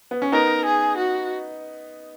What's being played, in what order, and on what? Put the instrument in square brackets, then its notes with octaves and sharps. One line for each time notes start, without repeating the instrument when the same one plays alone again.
[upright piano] B3
C#4
[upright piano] B3 D#4 [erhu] A#4
[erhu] G#4
F#4